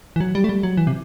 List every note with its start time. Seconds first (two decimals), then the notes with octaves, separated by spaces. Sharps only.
0.16 E3
0.20 F#3
0.35 G3
0.44 A3
0.49 G3
0.63 F#3
0.77 E3
0.87 C3